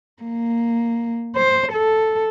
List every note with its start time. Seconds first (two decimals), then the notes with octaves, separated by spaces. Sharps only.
0.23 A#3
1.36 C5
1.73 A4